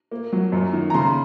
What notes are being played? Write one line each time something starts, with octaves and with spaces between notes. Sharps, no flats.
A#3
F#3
F#2
D#3
A#5
C#3 C6